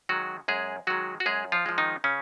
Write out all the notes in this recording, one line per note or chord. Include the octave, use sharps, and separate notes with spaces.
D#3 F#3 G#3 F#4
F#2 G#3 G#4
D#3 F#3 G#3 F#4
F#4
F#2 G#3 G#4
F3 F4
F3 G#3
D#3 D#4
C#3 C#4